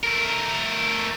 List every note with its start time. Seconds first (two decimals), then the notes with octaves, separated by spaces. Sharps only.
0.03 A3 A#4